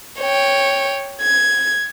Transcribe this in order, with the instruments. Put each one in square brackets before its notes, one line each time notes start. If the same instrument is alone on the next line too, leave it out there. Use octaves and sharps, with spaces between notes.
[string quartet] C#5 G5
G#6